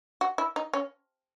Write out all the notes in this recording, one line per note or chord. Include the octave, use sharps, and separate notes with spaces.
F#4
E4
D#4
C#4